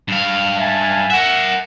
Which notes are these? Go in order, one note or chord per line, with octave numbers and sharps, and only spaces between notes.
G2 F5
E5 G#5 A5
A#4 E5 F#5